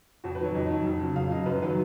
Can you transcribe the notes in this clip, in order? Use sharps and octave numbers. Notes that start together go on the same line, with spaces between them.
F2 F#4
B4
D#3 F#3 C#5
F2 D#5
D#3 F#3
F2
C#3 F#3
F2 F5
C#3 F#3 D#5
F#2 B4
D#3 F#3 B4